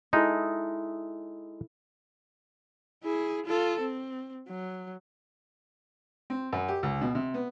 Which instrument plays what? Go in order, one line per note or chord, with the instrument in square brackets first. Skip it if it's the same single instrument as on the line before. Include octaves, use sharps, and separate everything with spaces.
[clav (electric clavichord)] G#3 D#4 [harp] E4 A4
[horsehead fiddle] E4 G#4
F4 A4
C4
F#3
[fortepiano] C4
F#2
G4
C#2
B2
C3
B3